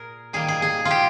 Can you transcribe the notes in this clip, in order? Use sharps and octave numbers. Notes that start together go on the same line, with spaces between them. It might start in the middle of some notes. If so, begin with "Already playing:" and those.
Already playing: A#2 G#4 A#4
D#3 G3 A#3 G#4
G#4
G#4
F4
G4